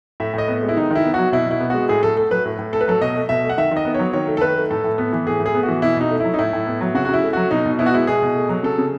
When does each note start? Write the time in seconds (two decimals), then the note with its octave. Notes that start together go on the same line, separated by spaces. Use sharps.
0.20 A2 E5
0.34 A2 D#5
0.48 B3
0.62 G#3
0.69 E4
0.76 D#3 D#4
0.90 D#3 E4
1.05 B3
1.14 F#3 F#4
1.32 B2 E4
1.47 B2 E4
1.61 B3
1.70 G#3 F#4
1.89 A2 G#4
2.03 A2 A4
2.17 A3 A4
2.31 F#3 B4
2.45 A2
2.59 A2
2.73 A3 A4
2.81 B4
2.88 F#3 A4
3.01 B2 D#5
3.16 A3
3.29 B2 E5
3.44 A3
3.50 F#5
3.57 D#3 E5
3.71 D#3
3.77 D#5
3.85 B3
3.94 F#3 C#5
4.13 D#3 C#5
4.27 A3
4.37 A4
4.41 D#3 B4
4.56 A3
4.71 A2 A4
4.84 A2
4.98 B3
5.13 E3
5.27 A2 G#4
5.40 A2
5.46 G#4
5.55 B3
5.63 F#4
5.68 E3
5.82 B2 E4
5.97 B2 D#4
6.10 A3
6.20 F#3 E4
6.34 D#4
6.39 A2 E4
6.53 A2
6.67 B3
6.81 F#3
6.94 C#3 F#4
7.05 F#4
7.09 C#3
7.14 E4
7.23 A3
7.33 F#3 F#4
7.51 B2 D#4
7.66 B2
7.79 B3 E4
7.86 F#4
7.94 G#3 E4
8.07 B2 G#4
8.22 B2
8.35 A3
8.49 F#3
8.63 C#3 A4
8.78 C#3